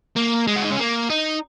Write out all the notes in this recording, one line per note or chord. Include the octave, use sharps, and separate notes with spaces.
A#3
G#3
F#4
D#4
C#4
A#3
D#4